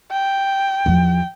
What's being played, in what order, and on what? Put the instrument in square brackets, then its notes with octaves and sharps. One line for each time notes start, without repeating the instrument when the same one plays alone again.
[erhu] G5
[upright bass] E2 F3